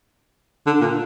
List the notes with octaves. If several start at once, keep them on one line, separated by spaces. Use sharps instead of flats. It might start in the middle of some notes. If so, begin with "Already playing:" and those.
D3
A#2